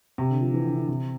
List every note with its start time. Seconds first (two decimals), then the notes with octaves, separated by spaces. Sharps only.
0.18 C3
0.31 D3
0.41 F3
0.54 E3
0.65 D3
0.76 D3
0.88 C3